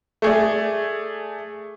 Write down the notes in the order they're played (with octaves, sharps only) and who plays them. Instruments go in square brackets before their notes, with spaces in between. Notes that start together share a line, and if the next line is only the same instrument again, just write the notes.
[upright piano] A3 G#4 D5